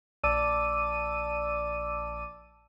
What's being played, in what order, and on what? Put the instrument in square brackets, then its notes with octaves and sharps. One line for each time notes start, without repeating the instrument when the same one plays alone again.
[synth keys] A#1 D5 A5 D6 E6 D#7